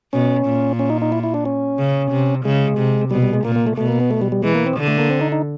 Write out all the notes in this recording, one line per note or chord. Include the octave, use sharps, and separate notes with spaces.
B2 C#4
A#2
C#4
D#4
D#4
E4
E4
D4
C#4
C#3
C3
C#3 G#3
C3
B2 G3
G3
G#3
A#2 A#3
A#3
A3
B2 A3
A#3
B3
A3
G3
G3
E3 G#3
A#3
C4
D3
A3
A#3
C4
D#4
D#4